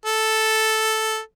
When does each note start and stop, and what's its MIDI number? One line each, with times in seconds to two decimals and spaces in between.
0.06 1.19 69